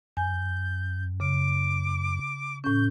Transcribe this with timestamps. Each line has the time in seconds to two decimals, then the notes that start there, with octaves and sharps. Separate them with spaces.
0.17 F#2 G#5 G6
1.20 C#3 D6
2.64 A2 C#4 G6